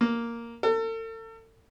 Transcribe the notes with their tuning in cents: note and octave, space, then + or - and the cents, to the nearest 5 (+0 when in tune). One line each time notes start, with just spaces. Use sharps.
A#3 +0
A4 +40